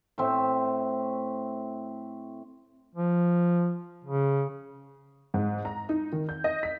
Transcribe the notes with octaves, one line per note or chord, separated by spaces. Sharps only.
A2 A3 C4 E5
F3
C#3
G#2
A#5
D#4
D#3
G6
D#5
B6